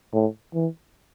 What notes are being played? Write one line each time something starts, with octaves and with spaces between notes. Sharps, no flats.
A2
E3